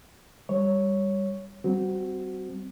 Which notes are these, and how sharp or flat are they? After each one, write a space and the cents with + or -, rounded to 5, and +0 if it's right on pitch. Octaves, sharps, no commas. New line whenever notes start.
G3 +15 C#5 +0
G3 -25 C4 -10 F#4 +0